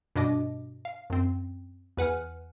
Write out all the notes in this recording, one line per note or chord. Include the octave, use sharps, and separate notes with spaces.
G2 B2 D4 D#5 D6
F5
F#2 C4
E2 B4 F#5 G#5 F6